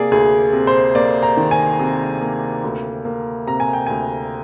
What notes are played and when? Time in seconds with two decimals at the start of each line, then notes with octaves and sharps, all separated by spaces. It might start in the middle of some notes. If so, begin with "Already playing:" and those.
Already playing: C3 A#3 G#4 D5
0.11 D2 G#4
0.53 C3
0.67 C5
0.95 A#3 D5
1.23 A#5
1.37 D#3
1.51 G#5
1.79 C3
2.21 A#3
2.64 D2
3.05 A#3
3.47 C3 A#5
3.60 G#5
3.73 G5
3.86 D2 G#5